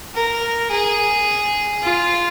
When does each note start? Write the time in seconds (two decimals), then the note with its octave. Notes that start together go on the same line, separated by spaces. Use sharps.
0.15 A#4
0.71 G#4
1.83 F4